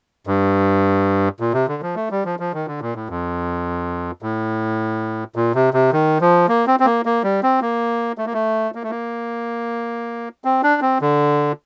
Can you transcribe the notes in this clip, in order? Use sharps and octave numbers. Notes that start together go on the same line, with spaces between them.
G2
A#2
C3
D3
F3
A3
G3
F3
F3
D#3
D3
A#2
A2
F2
A2
A#2
C3
C3
D#3
F3
A#3
C4
C4
A#3
A#3
G3
C4
A#3
A3
A#3
A3
A#3
A3
A#3
C4
D4
C4
D3